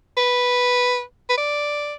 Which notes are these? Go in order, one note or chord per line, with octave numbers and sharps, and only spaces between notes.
B4
B4
D5